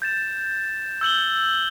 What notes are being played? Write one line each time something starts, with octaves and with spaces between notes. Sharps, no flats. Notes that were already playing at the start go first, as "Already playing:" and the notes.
G6 A6 E7
E6 G6 F#7 G7